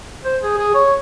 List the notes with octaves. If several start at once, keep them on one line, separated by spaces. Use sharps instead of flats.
C5
G#4
G#4
C#5